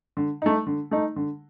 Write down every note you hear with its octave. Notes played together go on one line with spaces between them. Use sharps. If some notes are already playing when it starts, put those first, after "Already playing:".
D3
A3 D#4
D3
A3 D#4
D3